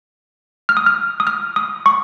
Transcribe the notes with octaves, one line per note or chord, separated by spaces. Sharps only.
F6
D#6
F6
D#6
F6
D#6
C#6